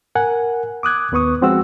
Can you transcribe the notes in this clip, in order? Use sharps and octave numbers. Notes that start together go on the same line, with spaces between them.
A#4 F#5 G#5
D6 D#6 F#6 G#6
D#2 B3 B4 C#6 D#6
F3 G#3 C4 F#4 F#5 E6